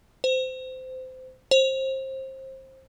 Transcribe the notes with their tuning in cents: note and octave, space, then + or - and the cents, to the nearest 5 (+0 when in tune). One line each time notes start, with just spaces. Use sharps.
C5 -20
C5 +25